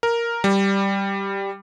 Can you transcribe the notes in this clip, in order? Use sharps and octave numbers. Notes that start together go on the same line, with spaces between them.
A#4
G3